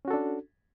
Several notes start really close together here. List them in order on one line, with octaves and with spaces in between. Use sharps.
C#4 F#4 A4 D4